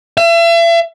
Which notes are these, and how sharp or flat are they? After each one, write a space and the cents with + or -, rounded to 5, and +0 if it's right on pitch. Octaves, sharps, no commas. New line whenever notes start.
E5 +40